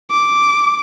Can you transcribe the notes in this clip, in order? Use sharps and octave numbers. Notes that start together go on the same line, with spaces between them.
D6